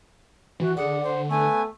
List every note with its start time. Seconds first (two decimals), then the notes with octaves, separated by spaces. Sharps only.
0.60 E3 F#4
0.77 D3 G#4 D5 F#5
1.04 C5 F#5
1.30 A3 B3 G#5